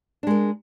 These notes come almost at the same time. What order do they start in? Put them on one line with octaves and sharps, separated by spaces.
D4 G#3 A#4